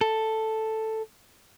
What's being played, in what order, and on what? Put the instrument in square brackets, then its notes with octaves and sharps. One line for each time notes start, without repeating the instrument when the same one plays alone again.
[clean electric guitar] A4